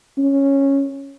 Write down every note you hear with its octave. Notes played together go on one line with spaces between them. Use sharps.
C#4